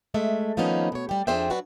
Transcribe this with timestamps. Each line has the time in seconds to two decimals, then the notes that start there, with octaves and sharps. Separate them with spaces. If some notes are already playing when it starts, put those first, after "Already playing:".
0.14 G#3 A3 E5
0.57 D#3 F3 A#3 B3 C#4 D#4
0.92 B2 C#5
1.09 G3 G4
1.27 F2 D4 G#4 C5 E5 G5
1.50 F#3 D4 F#4 B4